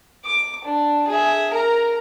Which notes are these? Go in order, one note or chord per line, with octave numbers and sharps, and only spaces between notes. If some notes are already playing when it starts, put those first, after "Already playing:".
D6
D4
G#4 E5
A#4 A#5